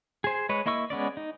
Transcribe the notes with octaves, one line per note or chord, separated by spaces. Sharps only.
G#4 C5
G#3 B4 C#5
A#3 E4 D#5 C#6 E6
G#3 B3 C#4 D5
D#4